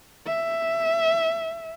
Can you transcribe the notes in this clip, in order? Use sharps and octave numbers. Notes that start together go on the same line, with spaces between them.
E5